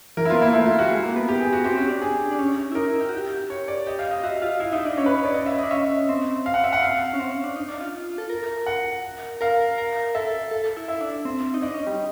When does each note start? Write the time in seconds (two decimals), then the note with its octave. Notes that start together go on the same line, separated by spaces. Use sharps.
0.17 E3 A#4
0.25 E4
0.30 B3 F4
0.41 A#3 E4
0.53 A3 E4
0.66 F4
0.79 G3 F#4
0.91 G#3
1.03 A#3
1.16 B3
1.28 G4
1.40 G#4
1.53 F#4
1.64 C4 G4
1.77 C#4
1.89 D4
2.02 G#4
2.31 D4
2.39 C#4
2.72 E4
2.75 D#4 A#4
2.88 E4
3.01 G4
3.09 F#4
3.17 G4
3.50 C#5
3.68 D5
3.87 G4 D#5
3.99 F5
4.11 D#5
4.23 F#4 E5
4.42 F4 F5
4.60 E4 F5
4.72 D#4 E5
4.85 D4 D#5
4.97 C#4 C#5
5.06 B4
5.16 C#5
5.25 D5
5.34 D#5
5.46 E5
5.58 D#5
5.63 D4
5.71 C#4 E5
6.09 C4
6.46 F5
6.54 F#5
6.64 E5
6.73 F#5
6.82 F5
7.14 C#4
7.20 C4
7.31 C#4
7.44 D4
7.56 D#4
7.69 D4
7.81 F4
8.18 A4
8.29 A#4
8.66 F#5
9.41 A#4 F5
9.78 A#4
10.15 A4 E5
10.51 A4
10.64 A4
10.77 E4
10.88 E4 E5
11.01 D4
11.25 C4
11.54 D#4
11.62 D4 D#5
11.74 C#4
11.87 G3